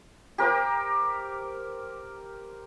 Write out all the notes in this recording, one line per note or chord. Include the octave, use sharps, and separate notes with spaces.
G4 A#4 C5 D6